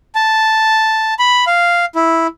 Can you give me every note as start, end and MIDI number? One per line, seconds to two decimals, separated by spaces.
0.15 1.14 81
1.19 1.45 83
1.47 1.85 77
1.95 2.27 64